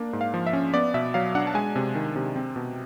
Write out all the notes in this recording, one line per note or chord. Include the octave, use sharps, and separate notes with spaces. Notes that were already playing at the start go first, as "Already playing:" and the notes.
Already playing: A#3 D4
G#2
F5
F3
E5
C#4
B3 D5
B2 E5
F#3 F5
D4 F#5
A5
G#3 G#5
C3
D#3
C3
C4
B2